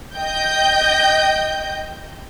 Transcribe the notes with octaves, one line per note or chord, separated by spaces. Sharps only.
D#5 G5 G6